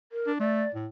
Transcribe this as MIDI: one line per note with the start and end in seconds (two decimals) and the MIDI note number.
0.12 0.32 70
0.27 0.36 62
0.40 0.65 57
0.40 0.70 74
0.74 0.87 45